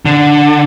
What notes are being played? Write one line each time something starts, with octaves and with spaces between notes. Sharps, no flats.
D3